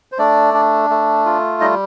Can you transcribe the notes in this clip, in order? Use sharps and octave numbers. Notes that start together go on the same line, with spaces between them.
C5
A3 D4 D5
D4
A3
F4
G3 D#4 D#5